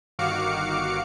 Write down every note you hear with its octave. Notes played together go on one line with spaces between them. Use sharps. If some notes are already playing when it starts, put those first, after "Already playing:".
G1 D#3 F#4 F5 D6 C#7